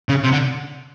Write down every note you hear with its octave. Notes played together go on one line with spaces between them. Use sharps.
C#3
C3
D3